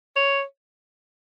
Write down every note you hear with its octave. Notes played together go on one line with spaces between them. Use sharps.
C#5